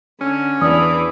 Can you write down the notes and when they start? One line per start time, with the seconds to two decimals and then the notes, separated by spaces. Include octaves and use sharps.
0.21 D3 C#4
0.61 E2 E3 D4 D#6